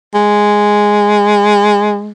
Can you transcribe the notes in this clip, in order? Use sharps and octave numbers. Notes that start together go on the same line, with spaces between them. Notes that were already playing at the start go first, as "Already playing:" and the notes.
G#3